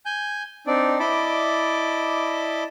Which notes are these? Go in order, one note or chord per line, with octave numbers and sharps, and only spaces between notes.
G#5 G6
C4 D4 D#4 D5
E4 D5 D#5 A5 B5 D6